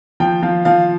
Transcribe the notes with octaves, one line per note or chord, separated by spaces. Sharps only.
F3 G5
F3 F5
F3 F5